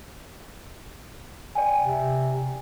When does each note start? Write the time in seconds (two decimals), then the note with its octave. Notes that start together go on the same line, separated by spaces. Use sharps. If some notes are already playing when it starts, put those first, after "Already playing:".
1.55 D5 G5 G#5
1.81 C3